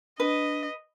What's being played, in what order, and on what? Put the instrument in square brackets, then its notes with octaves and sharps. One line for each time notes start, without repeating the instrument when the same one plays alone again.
[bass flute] D4 [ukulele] B4 [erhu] D#5